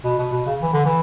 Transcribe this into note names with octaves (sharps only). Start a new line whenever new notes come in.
B2
B2
B2
C#3
E3
D3
E3